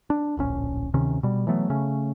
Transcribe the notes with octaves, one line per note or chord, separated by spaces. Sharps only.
D4
D1 A#1 C#4
D2 C3 D#3 C#4
B2 G3
E3 F#3 A3 B3
C#3 A3 C#4